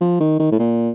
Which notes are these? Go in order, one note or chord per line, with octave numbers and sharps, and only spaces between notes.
F3
D#3
D#3
A2
A#2